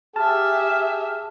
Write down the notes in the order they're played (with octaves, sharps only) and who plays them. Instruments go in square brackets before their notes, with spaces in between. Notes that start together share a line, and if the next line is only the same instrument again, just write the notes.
[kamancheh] G4 E5 [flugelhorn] G#4 [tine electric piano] A5 [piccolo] F6